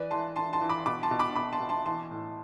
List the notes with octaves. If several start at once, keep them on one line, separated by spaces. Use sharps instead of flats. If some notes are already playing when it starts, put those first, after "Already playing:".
Already playing: E3 B4 D5
E3 A5 C6
E3 A5 C6
A5 C6
E3
B5 D6
B2 B5 D6
A5 C6
B2
B5 D6
B2 B5 D6
A5 C6
B2
A5 C6
E3 A5 C6
A2